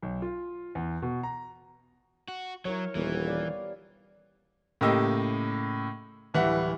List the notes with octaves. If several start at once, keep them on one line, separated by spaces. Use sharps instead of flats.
B1
F4
E2
B2
A#5
F#4
F#3 E4 A#4 C#5
D#1 E3 G3 B3
D5 F5
A2 C#3 A#3 G4 D#5 E6
D1 E3 G3 E5 F#5